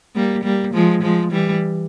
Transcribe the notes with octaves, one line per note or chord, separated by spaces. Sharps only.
G3 A#3
G3 A#3
F3 G#3
F3 G#3
E3 G3